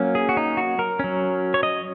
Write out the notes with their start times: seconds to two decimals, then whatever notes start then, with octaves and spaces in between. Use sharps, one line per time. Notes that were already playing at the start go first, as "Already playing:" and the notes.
Already playing: F#3 A#3 C#4
0.15 G#4
0.29 F#4
0.37 D#4
0.57 F#4
0.79 A#4
0.99 F#3 C#4
1.54 C#5
1.63 D#5